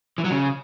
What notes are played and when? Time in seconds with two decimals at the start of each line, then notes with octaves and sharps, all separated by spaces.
0.18 E3
0.24 F#3
0.31 C#3